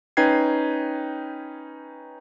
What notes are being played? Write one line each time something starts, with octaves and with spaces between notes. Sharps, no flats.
C#4 D#4 B4 G5 G#6 C7